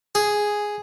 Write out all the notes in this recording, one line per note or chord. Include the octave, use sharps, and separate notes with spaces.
G#4